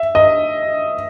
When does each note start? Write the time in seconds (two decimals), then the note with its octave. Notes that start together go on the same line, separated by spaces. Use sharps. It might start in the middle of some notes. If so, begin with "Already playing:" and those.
Already playing: E5
0.15 D#5